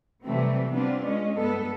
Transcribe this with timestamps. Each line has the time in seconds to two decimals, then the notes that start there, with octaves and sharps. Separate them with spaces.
0.23 C3 E3 F#3 G3 A3 C4
0.72 G3 B3 C4 D4 F4
1.03 G#3 C#4
1.38 G2 B3 A4